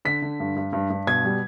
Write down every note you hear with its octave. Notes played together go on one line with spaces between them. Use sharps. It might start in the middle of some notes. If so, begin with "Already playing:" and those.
D3 B6
D3
G2
G2
G2
G2
B2 G#6
G3